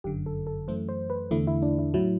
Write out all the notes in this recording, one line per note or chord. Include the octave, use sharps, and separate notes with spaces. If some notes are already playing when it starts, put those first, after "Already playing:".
G1 F#2 D3 G4
A4
A4
F#2 E3 A3 C5
C5
B4
E2 D3 A3 E4
E4
D4
E4
A2 F#3 E4